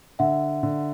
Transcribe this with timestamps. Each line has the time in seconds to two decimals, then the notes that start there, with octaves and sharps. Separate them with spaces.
0.19 D3 E5 F#5
0.63 D3